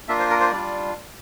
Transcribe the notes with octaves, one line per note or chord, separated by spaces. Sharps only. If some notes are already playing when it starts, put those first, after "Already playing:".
A#3 D4 F4 E5
C5
A#4
C5
G3 D4 F4 D5